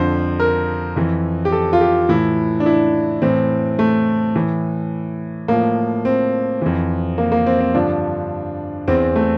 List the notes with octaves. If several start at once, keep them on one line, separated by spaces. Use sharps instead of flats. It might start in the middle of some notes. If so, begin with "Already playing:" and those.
Already playing: F2 D3 F3 C5
A#4
F2 E3
G4
A4
F4
G4
A2 E3 E4
D4
E4
A2 E3 C4
A3
A2 E3
A2 F3 A#3
C4
F2 E3
A#3
A#3
C4
C4
G2 D3 F3 D4
E2 E3 C4
A3